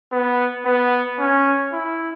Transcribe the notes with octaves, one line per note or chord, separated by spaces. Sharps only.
B3
B3
C#4
E4